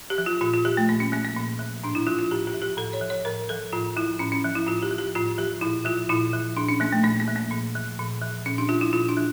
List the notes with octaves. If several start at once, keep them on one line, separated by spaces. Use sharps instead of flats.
G4
F3
F4
A#2 F4
F4
F3 G4
A3
A#2 A#3
C#4
F3 A#3
A#3
A#2
F3
A2 D4
E4
F3 F4
F4
A2 G4
G4
F3
G4
A2 A4
C#5
F3
C#5
A2 A#4
F3 A4
A2 F4
F3 E4
A2 C#4
C#4
F3
E4
A2 F4
G4
F3
G4
A2 F4
F3 G4
A#2 E4
F3 F4
A#2 E4
F3
A#2 D4
C#4
F3 A#3
A3
A#2 A#3
A#3
F3
A#3
A#2
F3
A#2
F3
A#2 C#4
D4
F3 F4
E4
A#2 F4
D4
F3